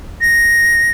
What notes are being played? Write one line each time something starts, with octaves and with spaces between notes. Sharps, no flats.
A#6